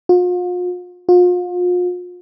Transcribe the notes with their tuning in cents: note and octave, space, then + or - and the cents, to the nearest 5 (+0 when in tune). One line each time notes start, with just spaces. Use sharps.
F4 +45
F4 +40